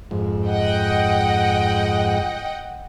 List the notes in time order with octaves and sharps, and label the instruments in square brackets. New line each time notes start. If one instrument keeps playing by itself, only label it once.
[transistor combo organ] F2 G#2
[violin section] D#5 F#5 G5